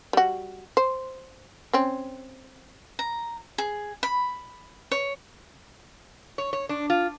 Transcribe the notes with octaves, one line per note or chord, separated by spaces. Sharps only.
G3 F#4
C5
C4 C#4
A#5
G#4
B5
C#5
C#5
C#5
D4
F4